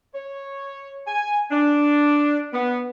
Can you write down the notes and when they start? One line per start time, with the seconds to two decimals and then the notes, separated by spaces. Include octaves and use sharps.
0.15 C#5
1.08 G#5
1.51 D4
2.54 B3